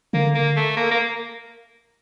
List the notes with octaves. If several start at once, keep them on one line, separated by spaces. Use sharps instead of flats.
D3 A#3
A#3
A3
A#3
A#3